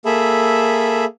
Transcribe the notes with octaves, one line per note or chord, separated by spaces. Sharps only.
A#3 G#4 A4 E5 B5